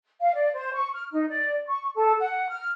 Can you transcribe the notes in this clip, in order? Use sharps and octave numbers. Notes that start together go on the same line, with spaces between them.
F5
D5
C5
C#6
F6
D#4
D5
C#6
A4
F#5
F6